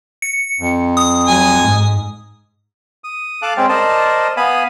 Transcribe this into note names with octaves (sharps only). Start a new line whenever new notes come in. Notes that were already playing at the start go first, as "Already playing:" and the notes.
C#7
F2
D#6
F#3 G#5
G#2
D#6
A4 F5 A5 D6 F#6
G#3 C4 C#4 G#4 G5
A#4 C5 D5 D#5 A5
B3 F5 G#5 B5 D#6